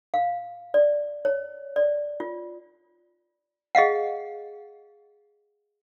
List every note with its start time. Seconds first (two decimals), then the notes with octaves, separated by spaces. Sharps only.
0.14 F5
0.74 D5
1.25 C#5
1.76 D5
2.20 F4
3.75 G#4 D#5 F5 F#5